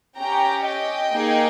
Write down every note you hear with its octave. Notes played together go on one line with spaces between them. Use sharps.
C#4 G4 G5 A#5
D#5 G5
A#3 D#4 G#4